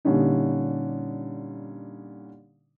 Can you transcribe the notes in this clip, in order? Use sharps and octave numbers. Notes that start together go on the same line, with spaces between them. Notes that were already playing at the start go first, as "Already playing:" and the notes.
A#2 D3 G3 C#4 D#4